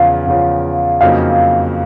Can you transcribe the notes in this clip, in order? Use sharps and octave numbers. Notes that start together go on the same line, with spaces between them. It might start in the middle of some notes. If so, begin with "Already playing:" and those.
Already playing: E2 C#3 F3 F5
E2 C#3 F3
F2 C#3 F#3 A#3 D#4 F5